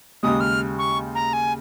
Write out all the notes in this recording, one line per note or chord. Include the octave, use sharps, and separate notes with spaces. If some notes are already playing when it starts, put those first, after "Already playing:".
D#2 C#3 G#3 D#6
F6
C#6
A#5
G#5